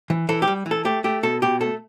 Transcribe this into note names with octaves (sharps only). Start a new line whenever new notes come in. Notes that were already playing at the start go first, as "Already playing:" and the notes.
E3
E3 A4
G4
G3
E3
A4
A3 G4
A3 G4
B2 A4
B2 G4
A3 A4